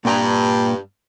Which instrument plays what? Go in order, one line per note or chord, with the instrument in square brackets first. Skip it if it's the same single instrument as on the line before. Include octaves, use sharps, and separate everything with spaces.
[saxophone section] G2 [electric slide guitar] A#2 G5 A#5